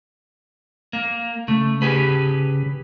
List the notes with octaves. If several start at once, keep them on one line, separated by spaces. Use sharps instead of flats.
A#3
C#3 A3
G4 G#4 B4